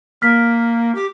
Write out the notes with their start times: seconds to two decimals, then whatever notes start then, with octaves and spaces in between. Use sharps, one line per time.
0.22 A#3 F6 B6
0.95 G4